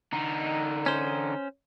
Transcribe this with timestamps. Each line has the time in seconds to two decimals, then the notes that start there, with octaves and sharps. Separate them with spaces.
0.13 D3 D#4
0.86 C#4 C5